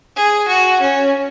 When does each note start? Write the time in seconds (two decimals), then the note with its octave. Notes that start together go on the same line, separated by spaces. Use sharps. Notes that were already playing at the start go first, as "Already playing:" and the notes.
0.16 G#4
0.48 F#4
0.80 C#4